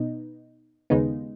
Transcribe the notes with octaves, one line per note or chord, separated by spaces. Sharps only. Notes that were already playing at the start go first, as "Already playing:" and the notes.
Already playing: B2 B3 D#4
D#2 C#3 G#3 B3 D#4